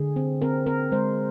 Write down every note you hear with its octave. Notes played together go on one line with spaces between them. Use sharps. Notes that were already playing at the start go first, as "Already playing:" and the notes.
Already playing: D3 G#4
C4
C4 A#4
C4 A#4
G#3 C5